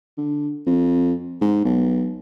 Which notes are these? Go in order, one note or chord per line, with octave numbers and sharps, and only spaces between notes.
D3
F2
G#2
B1